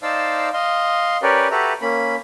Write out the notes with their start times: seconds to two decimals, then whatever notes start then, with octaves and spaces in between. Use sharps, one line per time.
0.02 D#4 C5 D5 F5 A5 E6
0.53 D#5 F5 C6
1.23 C#4 G4 A#4 B4 C#5 D5
1.51 F#4 G4 A4 B4 E5 A#5
1.82 A#3 C#4 B5